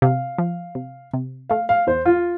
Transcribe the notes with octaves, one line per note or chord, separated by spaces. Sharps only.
C3 F5
F3
C3
C3
A3 F5
F5
E2 C5
F4